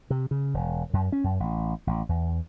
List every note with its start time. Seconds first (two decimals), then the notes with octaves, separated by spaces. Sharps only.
0.10 C3
0.31 C#3
0.54 E1
0.93 F#2
1.12 C#4
1.24 F#2
1.40 A1
1.87 A1
2.09 E2